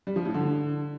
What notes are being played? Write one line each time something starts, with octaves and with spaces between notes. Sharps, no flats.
G3
F3
A2
D3